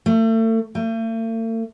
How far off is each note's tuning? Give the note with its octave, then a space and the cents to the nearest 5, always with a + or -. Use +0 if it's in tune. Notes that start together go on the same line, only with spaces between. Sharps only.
A3 +35
A3 +45